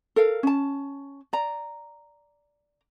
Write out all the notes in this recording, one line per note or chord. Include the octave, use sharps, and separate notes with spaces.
A4 A#4 F5
C#4 A5
D5 A#5